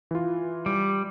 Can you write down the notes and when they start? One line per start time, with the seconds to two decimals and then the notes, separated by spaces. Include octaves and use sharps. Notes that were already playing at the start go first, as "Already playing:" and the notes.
0.11 E3 F4
0.66 G3